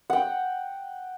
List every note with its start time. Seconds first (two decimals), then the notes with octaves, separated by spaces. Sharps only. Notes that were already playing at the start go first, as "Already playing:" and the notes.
0.10 F#5 G5